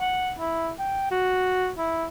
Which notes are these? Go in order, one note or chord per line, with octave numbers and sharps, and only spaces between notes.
F#5
E4
G5
F#4
E4